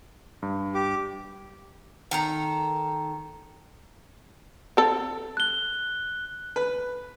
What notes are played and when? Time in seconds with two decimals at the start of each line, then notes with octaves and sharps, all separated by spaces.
0.42 G2
0.75 G4 D6
2.11 D#3 A4 A#5
4.77 C4 A4
5.37 F#6 G7
6.56 B4